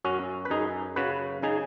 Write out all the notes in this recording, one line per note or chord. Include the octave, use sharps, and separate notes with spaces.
F#2 C#4 F#4
B4
F#2 D#4 G#4
C#3 F#4 B4
C#3 D#4 G#4